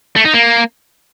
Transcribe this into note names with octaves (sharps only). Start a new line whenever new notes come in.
A3
D#4
A#3